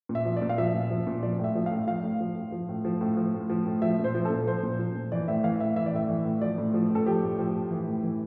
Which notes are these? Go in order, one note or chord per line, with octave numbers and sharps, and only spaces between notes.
A#2
E5
F3
D5
A#2
F5
F3 E5
A#2
F3
A#2
F3 D5
A2 E5
F3
F5
A2
F3 F5
A2
F3
A2
F3
A2
F3
A2
F3
A2
F3
A2
F3 E5
A#2
C5
F3
A4
A#2
F3 C5
A#2
F3
A#2
E3 D5
A2 E5
E3 F5
A2 E5
E3 E5
D5
A2 E5
E3
A2
F3 D5
A2
F3
A2 A4
F3 G4
A2
F3
A2
E3
A2
E3